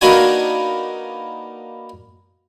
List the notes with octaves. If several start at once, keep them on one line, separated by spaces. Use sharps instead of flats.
A#3 B3 D4 D#4 F#4 G#5